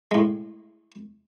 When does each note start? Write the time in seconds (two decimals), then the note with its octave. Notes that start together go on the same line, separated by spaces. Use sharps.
0.11 A2 G#3